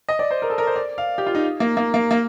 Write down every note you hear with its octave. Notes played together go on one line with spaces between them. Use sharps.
D#5
D5
C5
A#4
A4
A#4
C5
D5
F5
G4
F4
D#4
A#3
A#3
A#3
A#3